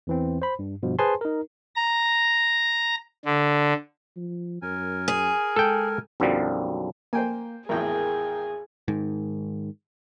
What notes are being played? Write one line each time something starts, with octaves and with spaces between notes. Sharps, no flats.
E2 E3 C4
C5 B5
G2
G2 B2 F3
G#4 B4 C5 G#5 A5 C6
D#4 A#4
A#5
D3
F3
F#2 A#4 G#5
G#4
G#3 A4 G5
B1 F#2 D3 F3 G3
A#3 C5 G5 G#5
G#1 E2 A2 G#4 A#4 G5
G#2 D#3